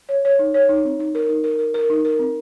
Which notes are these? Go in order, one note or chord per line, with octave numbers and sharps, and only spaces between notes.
C#5
C#5
D#4
C#5
D#4
C4
D#4
A#4
D#4
A#4
A#4
A#4
D#4
A#4
C4